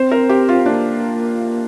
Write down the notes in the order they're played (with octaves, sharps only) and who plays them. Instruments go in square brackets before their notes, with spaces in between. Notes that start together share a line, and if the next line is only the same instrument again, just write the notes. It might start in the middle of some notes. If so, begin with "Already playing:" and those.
Already playing: [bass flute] C4 [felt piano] C5
[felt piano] A#4
G4
F4
[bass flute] A#3 [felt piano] D4